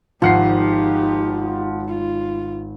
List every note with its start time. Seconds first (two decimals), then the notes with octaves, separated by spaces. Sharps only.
0.22 G#1 F3 D#4 G4 F#5 C7
1.89 F4